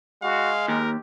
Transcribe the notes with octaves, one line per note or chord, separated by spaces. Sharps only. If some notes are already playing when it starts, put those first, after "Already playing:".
G#3 F#4 F5
D#2 G4 A#4